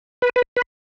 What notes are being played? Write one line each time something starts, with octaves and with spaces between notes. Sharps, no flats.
B4
B4
B4